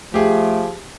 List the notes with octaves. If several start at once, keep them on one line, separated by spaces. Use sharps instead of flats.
F3 A3 G4 G#4